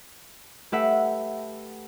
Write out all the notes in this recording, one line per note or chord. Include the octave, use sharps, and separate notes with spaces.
A3 G4 B4 E5 F#5